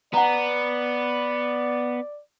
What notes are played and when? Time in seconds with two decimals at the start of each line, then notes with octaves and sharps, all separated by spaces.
0.14 B3 D5 F#5 A#5